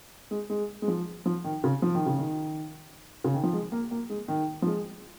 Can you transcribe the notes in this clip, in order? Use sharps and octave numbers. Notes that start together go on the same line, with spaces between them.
G#3
G#3
G#3
F3
F3
D#3
C#3
F3
D#3
C#3
D#3
C#3
D#3
F3
G#3
A#3
A#3
G#3
D#3
F3
G#3